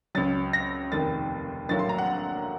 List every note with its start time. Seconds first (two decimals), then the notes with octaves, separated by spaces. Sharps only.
0.15 C#2 C#3 F#3 A6
0.53 A#6
0.92 F1 D#2 D#3 A6
1.69 A#1 A2 F#3 A#3 A6
1.79 C6
1.89 A#5
1.98 F#5